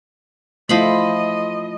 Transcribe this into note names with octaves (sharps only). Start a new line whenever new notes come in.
F3 A3 E4 C5 D#5 B5